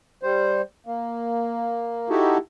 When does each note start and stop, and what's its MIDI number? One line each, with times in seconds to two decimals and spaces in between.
0.23 0.62 55
0.23 0.62 72
0.86 2.09 58
2.10 2.38 63
2.10 2.38 64
2.10 2.38 66
2.10 2.38 67
2.10 2.38 69